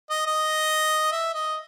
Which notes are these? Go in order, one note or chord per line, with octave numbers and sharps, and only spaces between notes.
D#5
D#5
E5
D#5